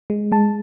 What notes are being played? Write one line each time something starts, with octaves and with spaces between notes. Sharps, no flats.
G#3
G#3 A5